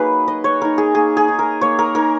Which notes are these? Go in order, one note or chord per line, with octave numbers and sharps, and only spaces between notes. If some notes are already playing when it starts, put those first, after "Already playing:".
Already playing: F#3 A#3 D#4 G#4 B4
F#3 D#5
C#5
A#3 D#4 A#4
G#4
A#3 G#4
G#4
D#4
A#4
A#3 C#5
A#4
D#4 A#4